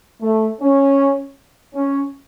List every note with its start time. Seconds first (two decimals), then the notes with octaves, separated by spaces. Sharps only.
0.21 A3
0.60 C#4
1.74 C#4